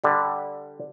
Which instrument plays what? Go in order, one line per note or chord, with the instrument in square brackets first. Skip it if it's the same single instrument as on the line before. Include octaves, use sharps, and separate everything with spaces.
[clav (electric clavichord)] D3 G3